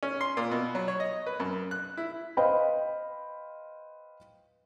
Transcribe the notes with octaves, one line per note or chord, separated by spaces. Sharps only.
C#4
C6
A#2
B2
F#3
C#5
D#5
B4
F#2
F#6
E4
B4 C5 D#5 F5 G5 B5